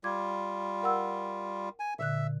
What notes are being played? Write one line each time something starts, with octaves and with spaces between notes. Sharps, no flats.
G3 F4 D6 G#6
A#4 F#5 E6
G#5
A#2 D3 E5 F#6